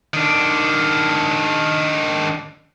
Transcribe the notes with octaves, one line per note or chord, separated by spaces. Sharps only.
D#3 D4